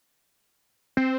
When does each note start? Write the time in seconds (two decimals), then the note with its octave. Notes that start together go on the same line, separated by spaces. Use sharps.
0.97 C4